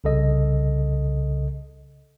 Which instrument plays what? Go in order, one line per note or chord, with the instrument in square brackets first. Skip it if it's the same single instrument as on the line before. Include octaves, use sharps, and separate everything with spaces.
[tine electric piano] C2 C#3 A4 D#5